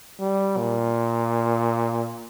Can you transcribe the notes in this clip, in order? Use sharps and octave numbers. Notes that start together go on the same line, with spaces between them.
G3
A#2